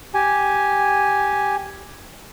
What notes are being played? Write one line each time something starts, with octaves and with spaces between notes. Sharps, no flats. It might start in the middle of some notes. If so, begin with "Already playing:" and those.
G4 G#5